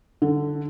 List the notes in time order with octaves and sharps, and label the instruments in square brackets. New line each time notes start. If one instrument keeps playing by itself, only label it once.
[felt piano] D3